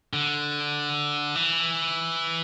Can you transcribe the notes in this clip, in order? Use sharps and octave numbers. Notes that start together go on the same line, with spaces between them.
D3
E3